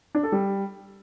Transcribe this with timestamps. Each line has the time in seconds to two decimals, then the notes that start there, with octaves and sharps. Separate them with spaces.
0.15 D4
0.23 A4
0.32 G3